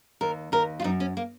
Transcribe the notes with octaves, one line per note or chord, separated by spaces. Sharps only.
D#2 A#4
D#2 A#4
F4
F#2 D#4
C#4
A#3